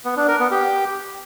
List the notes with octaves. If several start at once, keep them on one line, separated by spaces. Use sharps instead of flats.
B3
D4
A#4
B3
G4